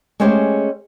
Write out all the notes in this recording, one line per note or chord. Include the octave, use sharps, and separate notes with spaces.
G#3 A3 C#4 G4 G#4 C5